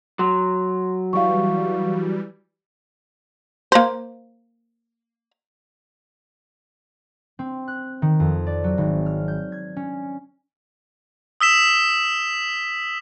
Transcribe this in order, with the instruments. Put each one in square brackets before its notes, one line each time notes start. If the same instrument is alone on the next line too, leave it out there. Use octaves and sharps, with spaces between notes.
[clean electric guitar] F#3 [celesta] C6
[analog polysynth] E3 G3 [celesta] F5 C#6
[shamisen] A#3 C5
[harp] C4
F#6
D#3
F2
D5
F#3
G#1
F6
G6
G#6
C#4
[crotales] D#6 E6 B6 E7